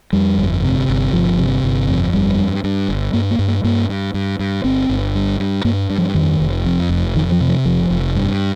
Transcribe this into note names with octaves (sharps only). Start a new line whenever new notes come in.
F2 G3
G1
C3
G1
G1 F3
C3
G1
F2
G1 G3
G2
G2
G1
G2 A#3
A#3
G2
A#3
G2 A#3
G2
G2
G2
G1 C4
G1
G2
G2
G2 A#3
G2
F3
F2 D#3
F1
F2
F1
F2 D#3
F3
C3
F3
F1 F3
F1
G2